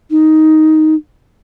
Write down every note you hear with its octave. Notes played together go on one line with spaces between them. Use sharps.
D#4